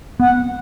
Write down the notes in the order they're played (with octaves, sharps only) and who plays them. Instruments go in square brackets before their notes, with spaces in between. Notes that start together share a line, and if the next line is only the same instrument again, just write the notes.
[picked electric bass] B3 [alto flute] F#5